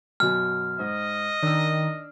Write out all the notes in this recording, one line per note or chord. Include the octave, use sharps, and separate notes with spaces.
F#2 B2 G#5 F6
G#2 D#5
D#3 D4 E6